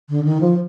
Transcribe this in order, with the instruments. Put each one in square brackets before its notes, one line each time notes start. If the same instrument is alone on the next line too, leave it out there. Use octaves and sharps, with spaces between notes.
[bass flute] D3
D#3
F3